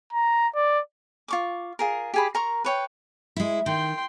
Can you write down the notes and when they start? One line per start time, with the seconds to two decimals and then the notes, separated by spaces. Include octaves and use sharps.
0.13 A#5
0.55 D5
1.28 F4 C#6 D6
1.79 F4 G#4 A#4
2.14 G4 G#4 B5
2.35 A#4 A#5 C6 C#6
2.65 B4 C#5 G5
3.36 G#3 E4
3.66 D#3 G5 C6